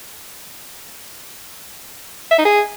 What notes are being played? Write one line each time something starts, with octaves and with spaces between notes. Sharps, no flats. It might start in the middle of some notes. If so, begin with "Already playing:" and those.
E5
D#4
G#4